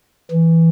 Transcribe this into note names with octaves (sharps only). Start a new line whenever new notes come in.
E3